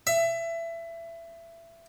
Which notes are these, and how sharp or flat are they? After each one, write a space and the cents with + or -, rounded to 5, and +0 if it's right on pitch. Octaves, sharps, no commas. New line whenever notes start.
E5 +20